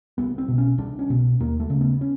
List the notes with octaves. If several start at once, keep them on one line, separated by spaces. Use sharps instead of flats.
C2 B3
C4
B2
C#4
C2 D4
C#4
B2
D#2 A#3
A3
C#3
B3
C#4